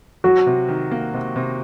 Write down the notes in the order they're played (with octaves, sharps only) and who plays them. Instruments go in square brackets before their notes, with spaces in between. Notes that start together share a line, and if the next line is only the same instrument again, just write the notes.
[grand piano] F#3 [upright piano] F#4
[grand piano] C3
D#3
A#3
C3
C3